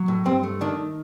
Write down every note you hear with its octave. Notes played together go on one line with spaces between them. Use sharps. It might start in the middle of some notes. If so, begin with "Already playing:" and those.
Already playing: F#3
A2
G2 C4
A3
D#3 D4